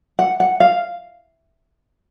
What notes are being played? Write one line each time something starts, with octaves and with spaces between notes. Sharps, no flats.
F#5
F#5
F5